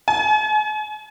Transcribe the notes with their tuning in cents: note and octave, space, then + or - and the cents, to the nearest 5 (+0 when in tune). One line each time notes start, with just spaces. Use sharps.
G#5 +40